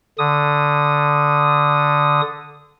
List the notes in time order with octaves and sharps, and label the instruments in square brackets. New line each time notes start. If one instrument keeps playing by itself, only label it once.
[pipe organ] D3 D#6